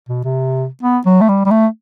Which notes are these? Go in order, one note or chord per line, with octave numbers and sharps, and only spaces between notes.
B2
C3
B3
F#3
A3
G3
G3
A3